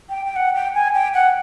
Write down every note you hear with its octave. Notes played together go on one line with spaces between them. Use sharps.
G5
G5
F#5
G5
G#5
G5
F#5